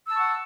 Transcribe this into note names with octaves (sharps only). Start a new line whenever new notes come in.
F#5 A5 C#6 E6